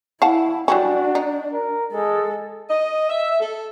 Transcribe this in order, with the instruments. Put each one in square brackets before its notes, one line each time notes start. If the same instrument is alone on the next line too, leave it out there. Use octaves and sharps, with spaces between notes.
[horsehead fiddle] E4 [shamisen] F5 F#5 A5
[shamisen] F#3 G3 C#4 [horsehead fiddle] D4 [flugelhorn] F#4
[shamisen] D#4
[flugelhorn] A#4
[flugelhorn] G#3 [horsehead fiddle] A4
[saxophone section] D#5
E5
A4